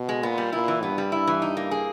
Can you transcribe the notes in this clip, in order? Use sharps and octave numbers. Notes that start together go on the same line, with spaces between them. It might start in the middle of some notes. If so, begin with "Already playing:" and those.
Already playing: B2
G#3
A#2 B3
G3
A#2 E4
E3
G2 B3
G3
E4
E3
D#4
A#3
G#4